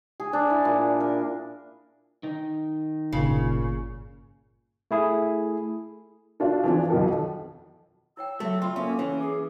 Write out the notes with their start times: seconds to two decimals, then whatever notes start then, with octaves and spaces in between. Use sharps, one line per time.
0.20 G#4
0.33 D4
0.50 E4
0.65 A#2
1.00 A#4
2.23 D#3 D#4
3.13 G1 A#2 C#3
4.91 A3 E4 G#4
6.40 D4 F4 F#4 A4
6.64 E3 F3 C4 D4 F4
6.90 B1 F2 D#3 F#3 A4
8.17 E4 C#5 G5 E6
8.40 F#3 A3 F#4 E5
8.62 F4 G5 B5
8.76 A#3 C#4 A4 C#5 E5 G#5
8.99 E3 C#4 C#5
9.21 G#4 D6